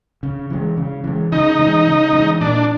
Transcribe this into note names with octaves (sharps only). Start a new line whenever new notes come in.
C#3
E3 G#3
C#3
E3 G#3
C#3 D#4
E3 G#3
C#3
E3 G#3
A#2 D4